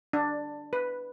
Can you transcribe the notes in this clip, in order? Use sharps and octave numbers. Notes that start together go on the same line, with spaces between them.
D4
B4